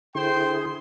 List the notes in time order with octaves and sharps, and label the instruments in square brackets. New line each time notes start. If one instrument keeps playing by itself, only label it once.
[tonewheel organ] D3 E4 G#4 [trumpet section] C5 G5 C6